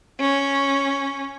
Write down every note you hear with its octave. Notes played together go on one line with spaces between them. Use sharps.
C#4